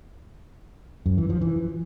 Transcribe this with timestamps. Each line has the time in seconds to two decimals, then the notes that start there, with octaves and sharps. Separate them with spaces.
1.06 F#2
1.18 E3
1.29 F3
1.41 E3